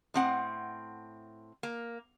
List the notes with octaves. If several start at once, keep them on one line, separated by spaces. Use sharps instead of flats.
A2 C4 F#5
A#3